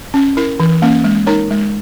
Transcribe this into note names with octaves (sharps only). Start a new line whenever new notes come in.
C#4
E4 A#4
E3
A#3 C#4
G#3
D#4 A#4 C#5
G#3